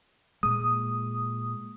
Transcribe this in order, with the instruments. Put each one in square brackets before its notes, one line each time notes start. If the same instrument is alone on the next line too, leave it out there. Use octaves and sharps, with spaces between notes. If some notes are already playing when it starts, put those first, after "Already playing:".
[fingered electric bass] A#2 G#3 [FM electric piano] D#6